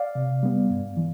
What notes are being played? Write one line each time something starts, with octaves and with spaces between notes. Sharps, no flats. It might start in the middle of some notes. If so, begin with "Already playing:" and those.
Already playing: D5 F5
C3
G3 B3
G2
E3